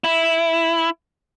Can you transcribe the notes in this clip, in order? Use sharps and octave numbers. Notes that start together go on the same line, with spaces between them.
E4